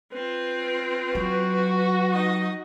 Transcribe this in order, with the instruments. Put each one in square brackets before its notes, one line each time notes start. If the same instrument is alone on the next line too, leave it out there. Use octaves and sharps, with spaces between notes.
[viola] C4 F4 [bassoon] B4
[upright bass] F#3 [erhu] F#4
[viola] D#4 D#5